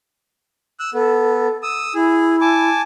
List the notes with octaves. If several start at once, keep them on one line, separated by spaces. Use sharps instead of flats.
E6 F#6
B3 A4
D#6 E6
E4 G#4
G#5 A5 D6